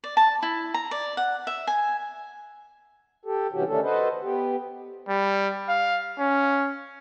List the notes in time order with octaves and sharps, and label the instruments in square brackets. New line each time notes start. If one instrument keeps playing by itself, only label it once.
[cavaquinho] D5
A5
E4
A#5
D5
F#5
E5
G#5
[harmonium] G4 A4
G2 C3 E3 C#4 F#4 G4
D3 D#3 A3 C#4 D4 A4
F#4 A4 B4 C5 D#5
B3 G4
[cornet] G3
F5
C#4